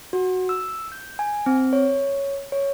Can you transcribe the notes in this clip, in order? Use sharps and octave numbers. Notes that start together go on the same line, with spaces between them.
F#4
E6
G6
G#5
C4
C#5
C#5